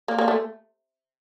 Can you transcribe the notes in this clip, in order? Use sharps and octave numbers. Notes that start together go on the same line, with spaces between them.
A#3
A#3
A3